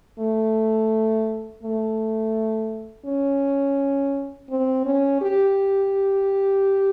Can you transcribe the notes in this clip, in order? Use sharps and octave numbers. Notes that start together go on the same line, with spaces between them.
A3
A3
C#4
C4
C#4
G4